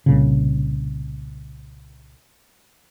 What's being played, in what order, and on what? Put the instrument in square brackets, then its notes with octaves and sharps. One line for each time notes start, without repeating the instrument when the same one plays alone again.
[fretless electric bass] C2 A#2 C#3